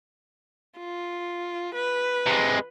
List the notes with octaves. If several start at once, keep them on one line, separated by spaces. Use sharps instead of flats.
F4
B4
C3 G#3